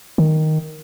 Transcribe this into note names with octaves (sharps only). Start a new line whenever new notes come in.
D#3